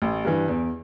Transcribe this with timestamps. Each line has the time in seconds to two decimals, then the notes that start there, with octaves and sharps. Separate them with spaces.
0.02 A1
0.25 G2 E3
0.48 E2